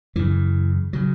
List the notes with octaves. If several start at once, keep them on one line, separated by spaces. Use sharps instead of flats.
F#2 C#3 E3
C#3 F#3